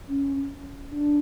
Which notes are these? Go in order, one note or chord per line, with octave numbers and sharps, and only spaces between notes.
C#4
D4